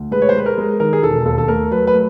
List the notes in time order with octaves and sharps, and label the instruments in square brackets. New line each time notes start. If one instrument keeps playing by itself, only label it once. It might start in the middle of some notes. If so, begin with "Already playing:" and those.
Already playing: [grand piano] D2
G#3 B4
C#5
C5
G#3 B4
A#4
G#3
D#3 A#4
G#4
E1 A4
D#2 A4
A4
A3 A#4
F#3 B4
B4
A3